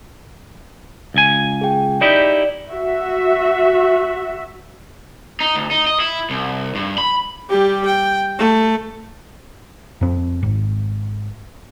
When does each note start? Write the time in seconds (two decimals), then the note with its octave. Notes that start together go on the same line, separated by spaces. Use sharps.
1.14 C#2 G#5
1.61 G#4 G5
2.01 D#4 E4 G4 D5
2.70 F#4 E5
5.40 D#4
5.55 D2
5.71 D#4
5.87 D#5
6.00 E4
6.30 C2
6.75 G2
6.98 B5
7.50 G3 G4
7.86 G5
8.39 A3
10.01 F2 C4
10.43 G#1